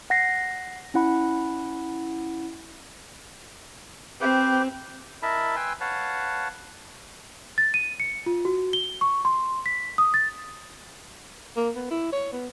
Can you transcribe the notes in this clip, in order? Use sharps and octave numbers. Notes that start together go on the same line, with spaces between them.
F#5 A#6 C7
C#4 E4 F#5 B5
C4 G4 B4 C5
E4 A#4 D#5 E5 A5 B5
B4 G5 G#5 C6 E6
B4 C#5 F5 F#5 A5
A6
D#7
C#7
F4
F#4
G7
C#6
C6
B6
D#6
A6
A#3
B3
E4
C#5
B3